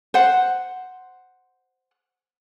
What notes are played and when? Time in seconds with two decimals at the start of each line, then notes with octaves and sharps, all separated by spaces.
0.14 C5 F#5